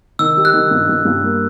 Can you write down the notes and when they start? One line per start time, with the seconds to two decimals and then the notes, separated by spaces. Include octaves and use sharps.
0.19 D#3 E6
0.37 G3
0.45 F#6
0.54 D#3
0.71 G2
0.89 G2
1.05 G2
1.22 A#3